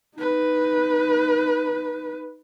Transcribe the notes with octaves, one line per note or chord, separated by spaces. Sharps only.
D#4 B4